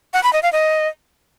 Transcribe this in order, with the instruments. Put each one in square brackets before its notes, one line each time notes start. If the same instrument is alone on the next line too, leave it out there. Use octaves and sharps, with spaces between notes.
[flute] F#5
B5
D#5
F5
D#5